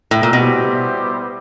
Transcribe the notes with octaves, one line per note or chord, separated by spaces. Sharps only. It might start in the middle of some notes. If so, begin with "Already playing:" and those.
A2
A#2
B2 G3 B3 E4 G4 C5